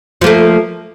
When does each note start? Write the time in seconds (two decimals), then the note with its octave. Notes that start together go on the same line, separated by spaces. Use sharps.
0.21 F3
0.24 A#3
0.26 A3